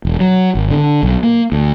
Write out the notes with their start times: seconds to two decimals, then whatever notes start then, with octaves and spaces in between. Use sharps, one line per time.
0.05 E1
0.20 F#3
0.55 G#1
0.71 D3
1.03 B1
1.23 A#3
1.52 D2